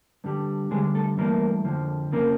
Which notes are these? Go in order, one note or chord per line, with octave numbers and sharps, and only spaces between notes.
G2 D3 G3
G2 D3 G3 G#3 G#4
A3 A4
G2 E3 A3 A#3 A#4
F2 D3 F3
F2 C#3 F3 A#3 A#4